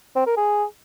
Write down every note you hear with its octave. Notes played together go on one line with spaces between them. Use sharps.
C4
A#4
G#4